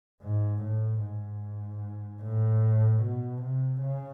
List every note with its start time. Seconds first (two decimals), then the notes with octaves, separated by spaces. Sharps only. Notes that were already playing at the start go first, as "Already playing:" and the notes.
0.23 G#2
0.62 A2
1.03 G#2
2.23 A2
3.02 B2
3.42 C3
3.81 C#3